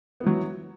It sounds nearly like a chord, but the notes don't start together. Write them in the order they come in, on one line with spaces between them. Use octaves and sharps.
B3 E3 F#3